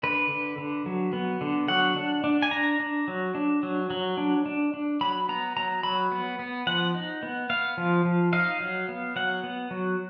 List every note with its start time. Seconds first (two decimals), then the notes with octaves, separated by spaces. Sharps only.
0.03 D3 B4
0.30 D3
0.58 D3
0.86 F#3
1.13 B3
1.41 D3
1.68 F#3 F#5
1.96 D4
2.24 D4
2.42 G#5
2.51 D4 A#5
2.80 D4
3.08 F#3
3.35 D4
3.63 F#3
3.90 F#3
4.17 D4
4.46 D4
4.74 D4
5.01 F#3 B5
5.29 B3 A#5
5.57 F#3 A#5
5.83 F#3 B5
6.12 B3
6.39 B3
6.67 F3 F#5
6.95 D#4
7.23 B3
7.50 B3 F5
7.77 F3
8.05 F3
8.33 D#4 F5
8.60 F#3
8.89 B3
9.16 F#3 F#5
9.44 B3
9.71 F#3